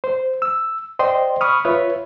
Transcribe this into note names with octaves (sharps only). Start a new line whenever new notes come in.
C5
E6
C5 D5 D#5 G5 C6
B5 C#6 D#6 F6
F4 B4 C#5 E5